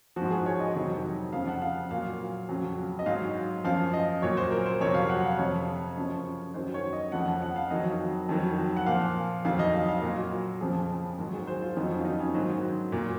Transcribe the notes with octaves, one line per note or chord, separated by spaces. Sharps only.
F3 F#4
G#2
G#4
C#5
D#5
F2 C3 D#3 F#3
F2 C#3 F3 F5
F#5
F5
A#2 F#3 F5
F2 C#3 F#3
D#5
G#2 F#3 F5
F#2 F3 F5
D#5
A#2 F#3 C#5
C5
A#4
C5
F2 C3 F#3 C#5
F5
F#5
F5
F2 C3 F3 C#5
F#2 C#3 F3
F#2 D#3 F#3 C5
C#5
D#5
F2 C#3 F3 F#5
F#5
F5
F2 D#3 F#3 D#5
F2 D#3 F#3
F#5
A#2 F3 F5
F2 D#3 F#3 F5
D#5
F5
F5
A#2 F#3
F2 C#3 F3 G#4
G#2 D#3 F#3
G#4
C5
F4
F2 D#3 F#3 D#4
C#4
F4
D#4
C#4
G#2 D#3 F#3 C5
A#2 F#3